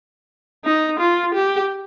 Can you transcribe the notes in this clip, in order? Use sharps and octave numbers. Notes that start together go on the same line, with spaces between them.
D#4
F4
G4